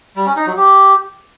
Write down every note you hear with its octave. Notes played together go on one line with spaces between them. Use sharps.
G3
C#4
D#4
F#3
G4